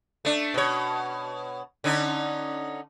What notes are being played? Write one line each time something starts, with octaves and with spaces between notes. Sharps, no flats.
A3 D4
B2 C#5
D3 C#4 D#4